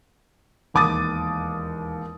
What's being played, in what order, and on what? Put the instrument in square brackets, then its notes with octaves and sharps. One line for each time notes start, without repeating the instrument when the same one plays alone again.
[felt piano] E1 D#2 D6 D#6 A6